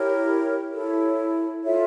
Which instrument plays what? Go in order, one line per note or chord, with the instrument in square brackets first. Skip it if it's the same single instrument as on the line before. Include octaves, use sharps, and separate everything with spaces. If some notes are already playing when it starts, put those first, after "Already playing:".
Already playing: [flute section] E4 G4 A#4 C#5
E4 A4 C#5
F4 A4 C#5 E5